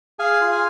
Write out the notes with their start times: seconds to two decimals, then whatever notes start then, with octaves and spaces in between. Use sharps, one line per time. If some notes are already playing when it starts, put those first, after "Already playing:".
0.19 G#4 F5 G#5
0.41 F4
0.52 F5 G#5